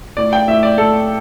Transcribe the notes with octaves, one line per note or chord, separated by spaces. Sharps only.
A2 D5
G5
A2 E5
D5
A2 A4